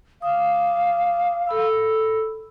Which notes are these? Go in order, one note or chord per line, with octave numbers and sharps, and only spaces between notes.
F5 D6 D#6
A4 B5 E6